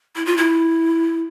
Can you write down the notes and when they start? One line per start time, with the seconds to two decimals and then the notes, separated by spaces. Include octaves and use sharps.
0.16 E4
0.26 F4
0.37 E4